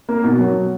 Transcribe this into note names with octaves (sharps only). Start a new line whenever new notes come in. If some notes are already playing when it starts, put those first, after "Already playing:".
A#3
B2
F#3